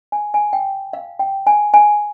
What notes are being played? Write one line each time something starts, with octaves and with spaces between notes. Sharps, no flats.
G#5
G#5
G5
F5
G5
G#5
G#5